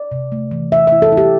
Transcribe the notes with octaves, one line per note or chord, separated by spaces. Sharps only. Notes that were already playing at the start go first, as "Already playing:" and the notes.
Already playing: D5
C3
A3
E3
E3 E5
E4 E5
A4
E4
G4